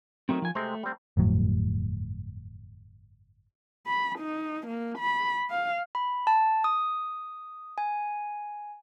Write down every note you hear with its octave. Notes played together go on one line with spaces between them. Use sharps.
D#3 F#3 A3 C4
F3 G#5
C3 G#3 A3 C4
G3 C4
G1 F2 A2 F#3
B5
D#4
A#3
B5
F5
B5
A5
D#6
G#5